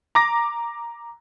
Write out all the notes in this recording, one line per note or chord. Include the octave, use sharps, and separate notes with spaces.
A#5 D6 A#6